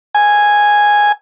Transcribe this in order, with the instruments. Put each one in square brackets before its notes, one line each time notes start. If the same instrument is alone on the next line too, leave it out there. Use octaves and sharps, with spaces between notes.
[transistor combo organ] G#5